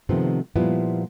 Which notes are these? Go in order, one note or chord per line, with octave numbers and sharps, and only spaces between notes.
C3 D#3 F3 A3 B3 C4
A#2 F3 G3 B3 E4